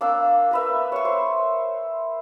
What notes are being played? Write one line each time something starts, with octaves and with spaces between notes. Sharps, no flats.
A#3 D4 D6 E6
A#4 B4 E5
C#5 C#6
C5